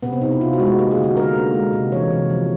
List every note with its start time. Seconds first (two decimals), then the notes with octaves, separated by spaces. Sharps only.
0.03 C3 B3
0.13 C4
0.21 C3 D#4
0.32 E4
0.41 C3 F4
0.53 F#4
0.60 G#3
0.66 F#4
0.78 A#3 G4
0.91 G#4
0.98 D3
1.04 F#4
1.16 D3 A#4
1.36 A#3
1.54 G#3
1.73 C3
1.92 E3 C#5
2.10 C3
2.30 F3